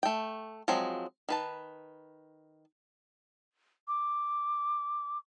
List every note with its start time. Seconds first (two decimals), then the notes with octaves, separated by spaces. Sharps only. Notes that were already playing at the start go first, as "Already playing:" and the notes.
0.03 A3 G5
0.68 F3 F#3 G#3 C4
1.29 D#3 B4 A5
3.88 D6